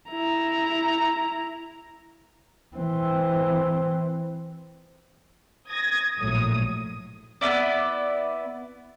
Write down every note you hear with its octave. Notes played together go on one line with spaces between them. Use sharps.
E4 A#5
E3 C4
D#6 G#6 A#6
A#1 A2 F#3 D#6
B3 D#4 E4 D5